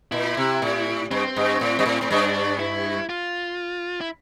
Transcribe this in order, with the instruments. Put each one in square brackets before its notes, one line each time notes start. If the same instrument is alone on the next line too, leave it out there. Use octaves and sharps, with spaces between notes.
[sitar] A#2 [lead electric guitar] E4
[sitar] C3
A2
[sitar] G2 [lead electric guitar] C4
[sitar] G2
A2
G2
A2
[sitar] A2 [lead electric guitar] C4
[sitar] G2 [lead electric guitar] D4
[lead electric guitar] E4
F4
E4